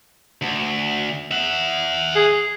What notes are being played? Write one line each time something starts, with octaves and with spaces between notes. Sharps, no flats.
D2
E5 F#5
G#4